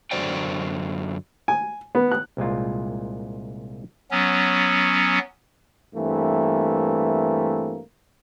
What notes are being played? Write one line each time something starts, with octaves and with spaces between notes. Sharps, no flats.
F#2 D3 F#4 C5 D5 G5
G#5
B3
F#6
C2 A#2 G#3 F4
F#3 B3 C#4
G2 E3 A3 A#3 C4